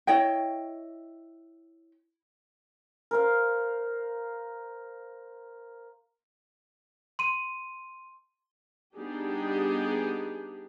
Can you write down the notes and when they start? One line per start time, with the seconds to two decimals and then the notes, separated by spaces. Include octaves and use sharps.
0.07 E4 C#5 D#5 G5
3.11 A#4 C5 F5
7.19 C6 D#7
8.97 G3 B3 D4 D#4 G4 G#4